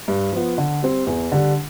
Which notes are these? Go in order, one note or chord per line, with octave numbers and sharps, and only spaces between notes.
G2
F3 B3
D3
G3 C4
E2
D3 G3 D4